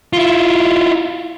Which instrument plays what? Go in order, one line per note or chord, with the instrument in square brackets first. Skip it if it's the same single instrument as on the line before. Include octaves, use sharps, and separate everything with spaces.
[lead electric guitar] E4 F4